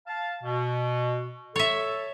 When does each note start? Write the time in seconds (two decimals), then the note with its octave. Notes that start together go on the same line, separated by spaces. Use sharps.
0.07 F5 A5
0.43 B2
1.56 A4 C#5 E5